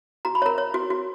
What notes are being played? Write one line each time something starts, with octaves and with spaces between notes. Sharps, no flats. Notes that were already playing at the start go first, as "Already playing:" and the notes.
F#4 A#5
B5
A#4 C#5 A#5
C#5
F#4
F#4